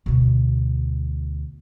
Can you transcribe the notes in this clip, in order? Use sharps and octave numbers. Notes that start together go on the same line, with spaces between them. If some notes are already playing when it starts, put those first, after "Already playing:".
D2 B2